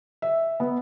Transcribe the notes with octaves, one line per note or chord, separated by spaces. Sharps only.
E5
B3